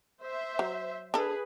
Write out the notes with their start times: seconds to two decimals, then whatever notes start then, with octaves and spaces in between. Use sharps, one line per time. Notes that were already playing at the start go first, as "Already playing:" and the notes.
0.22 C5 E5
0.59 F#3
1.14 D4 G#4 A4 B4